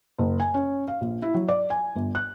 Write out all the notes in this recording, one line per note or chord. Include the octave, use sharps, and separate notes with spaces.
F#1
G#5
C#4
F5
A#1
E4
F#3
D5
G#5
G1
F#6